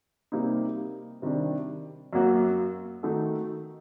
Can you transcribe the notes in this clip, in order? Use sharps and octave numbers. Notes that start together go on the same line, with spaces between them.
C3 G3 A#3 D#4
C3 D#3 G3 D4
F#2 F#3 A#3 F#4
D#3 A3 D#4 F#4 A4